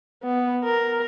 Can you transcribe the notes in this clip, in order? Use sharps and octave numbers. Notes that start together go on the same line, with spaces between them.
B3
A#4